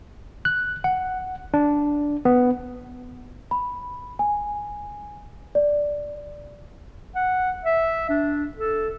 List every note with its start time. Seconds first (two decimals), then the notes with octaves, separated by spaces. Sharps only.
0.45 F#6
0.84 F#5
1.54 D4
2.25 B3
3.51 B5
4.19 G#5
5.55 D5
7.15 F#5
7.65 E5
8.09 D4
8.57 A4